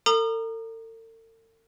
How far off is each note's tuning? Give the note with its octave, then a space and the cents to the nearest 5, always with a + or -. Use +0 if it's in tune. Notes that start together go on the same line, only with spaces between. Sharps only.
A4 +45 A#5 +0 D#6 -40